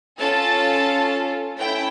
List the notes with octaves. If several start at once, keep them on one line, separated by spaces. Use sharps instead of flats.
C#4 F4 A4 A5
A3 C#4 E4 G5